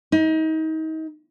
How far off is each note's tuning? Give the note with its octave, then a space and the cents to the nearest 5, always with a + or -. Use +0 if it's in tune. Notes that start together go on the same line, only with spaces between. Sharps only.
D#4 +30